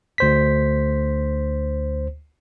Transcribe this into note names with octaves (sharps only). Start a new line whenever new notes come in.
D2 C5 B6